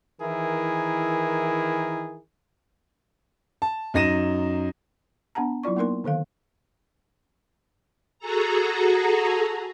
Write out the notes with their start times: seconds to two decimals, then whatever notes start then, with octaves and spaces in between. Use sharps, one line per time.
0.21 D#3 E3 E4 G#4 A#4
3.62 A5
3.94 F#2 D#4 A#6 D#7 E7
5.35 B3 D4 F#5 A5 A#5
5.63 F#3 E4 F4 D5 C#6
5.76 A#3 B3 D#4 A#4 C6
6.04 D3 D#3 A4 F5
8.19 F#4 G#4 A4 A#5